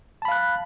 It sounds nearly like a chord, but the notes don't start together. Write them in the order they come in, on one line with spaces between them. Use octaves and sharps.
A5 B5 F5 F#6